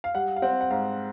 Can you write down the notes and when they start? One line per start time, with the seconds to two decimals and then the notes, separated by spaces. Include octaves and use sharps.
0.04 F5
0.15 G3 F#5
0.36 F5
0.42 C4 F#5
0.61 F#5
0.70 G#2 F5